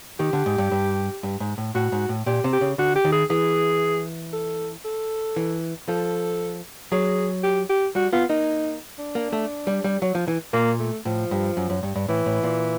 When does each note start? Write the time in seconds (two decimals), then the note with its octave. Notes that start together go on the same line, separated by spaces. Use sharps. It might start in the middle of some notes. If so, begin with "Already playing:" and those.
0.19 D#3 G4
0.33 D3
0.46 G#2
0.58 G2
0.72 G2
1.23 G2
1.40 G#2
1.58 A2
1.75 A2 F#4
1.92 G#2
2.09 A2
2.26 A#2 G4
2.44 C3
2.53 G4
2.61 C#3
2.78 D3 F#4
2.95 G4
3.05 D#3
3.12 G#4
3.30 E3 G#4
4.33 A4
4.85 A4
5.36 E3
5.88 F3 A4
6.92 F#3 G#4
7.43 G4
7.69 G4
7.95 G3 F#4
8.12 B3 F4
8.29 A#3 D#4
8.98 D4
9.15 A#3
9.33 A3
9.67 G3
9.84 G3
10.02 F#3
10.15 F3
10.28 E3
10.53 A#2 A#3
10.80 A3
11.05 A2 F3
11.31 G2
11.57 F#2
11.70 F#2
11.83 G2
11.96 G2
12.08 A2 E3
12.26 A2
12.43 A#2